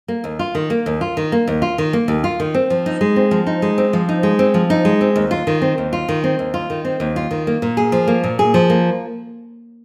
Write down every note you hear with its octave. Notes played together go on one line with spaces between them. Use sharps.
A#3
D#2
F4
D#3
A#3
D#2
F4
D#3
A#3
D#2
F4
D#3
A#3
D#2
F4
D#3
C4
F3
D#4
G#3
C4
F3
D#4
G#3
C4
F3
D#4
G#3
C4
F3
D#4
G#3
C4
D#2
F4
D#3
C4
D#2
F4
D#3
C4
D#2
F4
D#3
C4
D#2
F4
D#3
A#3
A#2
G#4
F3
A#3
A#2
G#4
F3
A#3